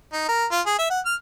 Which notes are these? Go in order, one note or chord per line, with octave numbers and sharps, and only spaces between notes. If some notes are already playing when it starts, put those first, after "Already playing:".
D#4
A#4
F4
G#4
E5
F#5
F6